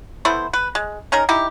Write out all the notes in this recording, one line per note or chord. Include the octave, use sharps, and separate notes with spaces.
A3 B3 E4 C5
B4
G#3
C#4 D#4 G#4 A#4
D#4 E4 G4